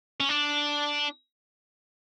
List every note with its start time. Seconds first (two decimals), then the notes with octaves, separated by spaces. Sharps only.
0.21 C#4
0.29 D4